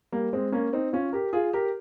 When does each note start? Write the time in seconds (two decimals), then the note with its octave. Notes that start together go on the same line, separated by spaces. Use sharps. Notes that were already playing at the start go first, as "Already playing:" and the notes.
0.12 G3 A#3
0.33 G#3 C4
0.52 A#3 C#4
0.73 C4 D#4
0.93 C#4 F4
1.13 G4 A#4
1.33 F4 G#4
1.53 G4 A#4